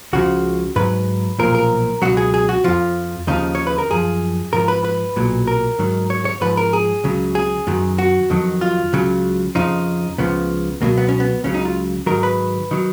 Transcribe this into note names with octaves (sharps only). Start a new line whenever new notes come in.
C#2 C#3 F3 F#4
G#2 F#3 B4
B1 A#2 F3 A#4
A#4
C#2 B2 F#3 F#4
G#4
G#4
F#4
F2 F3 F4
D#2 C#3 F3 D#4
C#5
B4
A#4
F#2 F3 G#4
G#2 F3 A#4
B4
B4
B1 A#2 F#3
A#4
G#2 D#3 F#3
C#5
C#5
G#2 F3 B4
A#4
G#4
C#2 C#3 F#3
G#4
F#2 D#3 F#3
F#4
F2 D#3 F#3
F4
C#2 C#3 F#3
F2 C#3 F3 D#4
C#2 C#3 F3 B3
C#2 B2 F#3 A#3
B3
C#4
B3
C#2 C#3 F#3 C#4
D#4
F4
G#2 D#3 F#3 A#4
B4
D#3 F#3